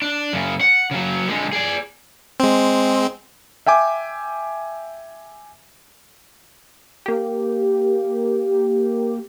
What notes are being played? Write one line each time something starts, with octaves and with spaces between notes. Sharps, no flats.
D4
F#2 C#3
F#5
C#3 F#3
D3 G#3
G#4 D5
G#3 C4
E5 G5 G#5 D6
A#3 G4